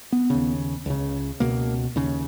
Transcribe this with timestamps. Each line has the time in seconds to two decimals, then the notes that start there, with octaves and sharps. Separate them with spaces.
0.12 B3
0.30 D#2 C#3
0.86 C#2 C#3
1.40 C#2 B2 A#3
1.96 D#2 C#3